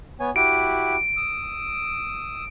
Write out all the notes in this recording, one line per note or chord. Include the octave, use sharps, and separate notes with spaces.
B3 C#5 G#5
E4 F#4 G4 D7
D#6 E6